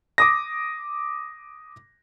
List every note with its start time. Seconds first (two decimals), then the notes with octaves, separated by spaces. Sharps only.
0.18 D6 D#6 A#6